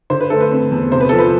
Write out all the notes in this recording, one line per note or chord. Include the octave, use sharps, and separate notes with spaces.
D3 C5
B4
A3 A4
B4
C4
E2
C3 C5
B4
F3 A4
B4